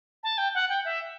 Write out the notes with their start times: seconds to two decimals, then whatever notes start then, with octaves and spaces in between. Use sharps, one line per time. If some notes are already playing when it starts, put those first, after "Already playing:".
0.23 A5
0.38 G5
0.55 F#5
0.69 G5
0.85 E5